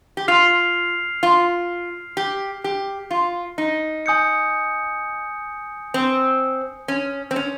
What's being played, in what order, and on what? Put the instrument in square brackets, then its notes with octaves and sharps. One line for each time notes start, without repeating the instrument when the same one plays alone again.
[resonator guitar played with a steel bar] G4
[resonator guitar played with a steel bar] F4 [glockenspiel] F6 C7 F7
[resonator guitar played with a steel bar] F4
G4
G4
F4
D#4
[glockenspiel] G#5 D#6 G6 C#7
[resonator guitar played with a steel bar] C4
C#4
C4
C#4